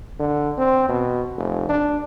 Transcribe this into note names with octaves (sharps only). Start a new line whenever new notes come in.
D3
C4
B2
F1
D4